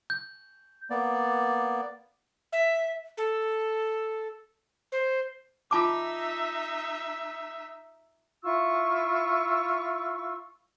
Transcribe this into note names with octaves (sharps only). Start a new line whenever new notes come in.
G6
A#3 B3 D5
E5
A4
C5
D#4 F4 E5 A5 D6
E4 F4 C#6 E6